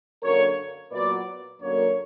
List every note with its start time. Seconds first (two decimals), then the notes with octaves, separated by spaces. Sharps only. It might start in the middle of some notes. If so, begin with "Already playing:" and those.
0.23 F#2 D3 A#3 A#4 C#5
0.91 A#2 F#3 B3 B4 D5
1.61 F#2 D3 F#3 A#3 A#4 C#5